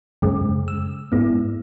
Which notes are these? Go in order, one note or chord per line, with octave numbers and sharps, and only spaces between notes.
F#2 C#3 G#3
E6
G#2 G#3 B3 E4